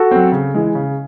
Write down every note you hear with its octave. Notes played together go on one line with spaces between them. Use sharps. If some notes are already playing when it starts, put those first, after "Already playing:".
Already playing: F#4 A4
F#3 C4
C#3
E3 G#3
C#3